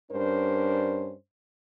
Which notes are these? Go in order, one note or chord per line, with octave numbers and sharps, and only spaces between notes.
G2 C#4 D4 A#4 C5